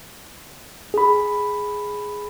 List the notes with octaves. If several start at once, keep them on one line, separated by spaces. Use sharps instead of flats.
G#4 B5